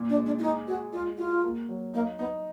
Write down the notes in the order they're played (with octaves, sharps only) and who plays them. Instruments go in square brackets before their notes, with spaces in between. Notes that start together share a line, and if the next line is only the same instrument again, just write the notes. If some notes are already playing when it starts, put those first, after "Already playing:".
Already playing: [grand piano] A#2
[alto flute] D4
[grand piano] G#3
[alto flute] D4
F4
[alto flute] D#4 [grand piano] G#4
[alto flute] F#4 [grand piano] G#4
[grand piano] G#3 [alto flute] F4
[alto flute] F4 [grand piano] F#4
[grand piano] A#3
F#3
[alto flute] A#3 [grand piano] D#4
[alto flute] B3 [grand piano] D#4